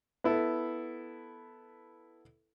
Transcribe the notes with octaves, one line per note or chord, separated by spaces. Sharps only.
B3 E4 A4